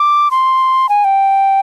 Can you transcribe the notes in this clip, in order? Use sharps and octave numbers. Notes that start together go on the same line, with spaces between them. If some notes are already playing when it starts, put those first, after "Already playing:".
Already playing: D6
C6
G#5
G5